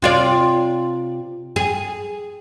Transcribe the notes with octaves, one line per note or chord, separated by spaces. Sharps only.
C3 F4 D5
G#4